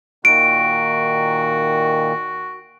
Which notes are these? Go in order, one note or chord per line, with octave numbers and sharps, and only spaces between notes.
A#2 D#3 F#4 D7